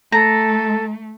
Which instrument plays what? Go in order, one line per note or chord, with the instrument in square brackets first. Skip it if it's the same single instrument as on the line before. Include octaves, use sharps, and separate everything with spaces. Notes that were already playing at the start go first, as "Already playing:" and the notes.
[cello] A3 [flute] A4 [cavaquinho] A#5